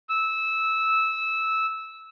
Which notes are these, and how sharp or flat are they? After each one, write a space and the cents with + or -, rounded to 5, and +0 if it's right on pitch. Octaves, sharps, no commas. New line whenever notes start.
E6 -15